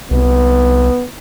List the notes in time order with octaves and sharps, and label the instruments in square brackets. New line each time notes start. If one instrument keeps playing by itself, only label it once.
[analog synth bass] C2 [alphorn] B3